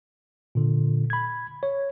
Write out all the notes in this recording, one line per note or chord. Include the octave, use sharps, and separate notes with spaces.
A#2 D3
B5 G#6
C#5